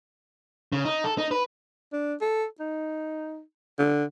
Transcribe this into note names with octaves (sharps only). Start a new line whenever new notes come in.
C#3
D#4
A4
D#4
B4
D4
A4
D#4
D3